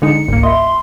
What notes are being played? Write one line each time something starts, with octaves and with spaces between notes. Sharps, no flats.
D3 G#3 D#4 C#7
G1 C#2 G#2 A#3
F4 D#5 E5 B5 C6